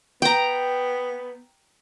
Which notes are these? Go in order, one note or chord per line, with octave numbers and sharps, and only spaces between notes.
B3 G5 A#5